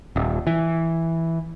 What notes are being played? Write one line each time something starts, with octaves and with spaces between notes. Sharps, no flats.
D#1
E3